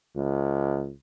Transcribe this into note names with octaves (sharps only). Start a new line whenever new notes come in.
C#2